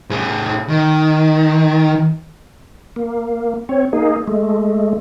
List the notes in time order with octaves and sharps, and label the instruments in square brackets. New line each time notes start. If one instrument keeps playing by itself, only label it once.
[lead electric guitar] A2 G#4
D#3
[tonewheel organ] A#3
C4 C#5
A#3 D#4 G#4
G#3 A3